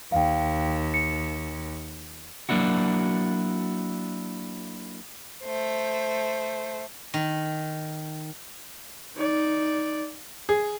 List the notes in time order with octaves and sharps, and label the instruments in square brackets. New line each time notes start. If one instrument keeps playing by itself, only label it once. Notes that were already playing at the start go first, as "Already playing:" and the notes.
[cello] D#2 [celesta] F5 G5
[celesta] C#7
[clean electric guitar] F#3 A#3 D4 E4 F#4
[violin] A3 C5
[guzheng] D#3
[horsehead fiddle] D#4 D5
[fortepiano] G#4